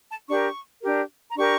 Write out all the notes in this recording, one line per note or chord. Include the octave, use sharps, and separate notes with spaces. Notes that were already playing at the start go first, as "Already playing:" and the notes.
A5
D4 G4 A#4 C#6
D4 G4 A#4
A#5
D4 G4 A#4 C#6